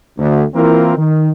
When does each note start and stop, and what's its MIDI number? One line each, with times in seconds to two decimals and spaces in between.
0.18 0.44 38
0.55 0.94 52
0.55 0.94 58
0.55 0.94 60
0.55 0.94 64
0.55 0.94 65
0.55 0.94 70
0.97 1.30 51